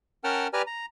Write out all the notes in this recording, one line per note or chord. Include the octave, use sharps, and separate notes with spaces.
C#4 A#4 F#5 G5 A5 F6
G4 B4 D5 G#5 A#5 F6
A#5